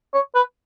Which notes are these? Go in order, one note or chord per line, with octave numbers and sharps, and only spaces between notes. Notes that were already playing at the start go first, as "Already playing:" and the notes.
C#5
B4